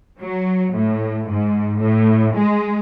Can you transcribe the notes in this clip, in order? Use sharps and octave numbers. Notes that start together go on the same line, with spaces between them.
F#3
A2
G#2
A2
G#3